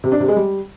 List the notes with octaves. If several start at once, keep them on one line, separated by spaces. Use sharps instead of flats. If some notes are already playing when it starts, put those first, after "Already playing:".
C3
D4
C3
G#3
G3